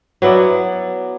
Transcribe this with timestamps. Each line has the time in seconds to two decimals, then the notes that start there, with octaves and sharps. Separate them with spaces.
0.22 F#3 B3 E4 D5